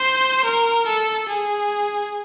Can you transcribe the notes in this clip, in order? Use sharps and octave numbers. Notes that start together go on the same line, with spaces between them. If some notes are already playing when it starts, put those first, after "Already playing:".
Already playing: C5
A#4
A4
G#4